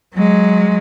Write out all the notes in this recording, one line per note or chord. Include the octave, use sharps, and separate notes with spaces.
F#3 G#3